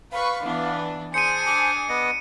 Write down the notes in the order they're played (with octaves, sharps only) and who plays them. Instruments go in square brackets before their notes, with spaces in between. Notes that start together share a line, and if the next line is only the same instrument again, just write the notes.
[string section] B4 C#6 [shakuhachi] F5
[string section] E3 B3 D4
[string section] D4 G#4 [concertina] C5 [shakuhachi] C6 [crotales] C#7 D#7
[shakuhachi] D6
[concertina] B3 D#5